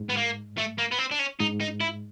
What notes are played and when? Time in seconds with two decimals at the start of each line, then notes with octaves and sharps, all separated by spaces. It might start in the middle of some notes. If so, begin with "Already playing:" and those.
Already playing: G#2
0.10 B3
0.17 A#3
0.58 A3
0.78 A#3
0.92 B3
0.99 C4
1.11 D4
1.19 C#4
1.40 G#2 D#4
1.61 D#4
1.81 E4